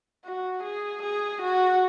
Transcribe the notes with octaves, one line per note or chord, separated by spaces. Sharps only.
F#4
G#4
G#4
F#4